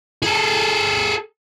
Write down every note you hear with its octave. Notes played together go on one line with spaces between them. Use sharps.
G#4 A4